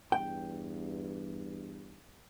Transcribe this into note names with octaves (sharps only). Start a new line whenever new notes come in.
E2 G2 G5